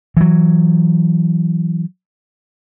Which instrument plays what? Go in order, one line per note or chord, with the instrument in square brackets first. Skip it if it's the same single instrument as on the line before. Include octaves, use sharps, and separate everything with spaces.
[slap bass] E3 F#3